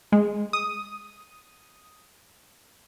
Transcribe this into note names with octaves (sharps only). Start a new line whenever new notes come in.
G#3
D#6